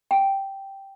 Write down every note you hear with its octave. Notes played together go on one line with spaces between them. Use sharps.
G5